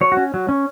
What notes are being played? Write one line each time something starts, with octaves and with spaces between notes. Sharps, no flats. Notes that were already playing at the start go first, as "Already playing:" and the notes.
F#3 C#5
F#4
C#4
F#3
C#4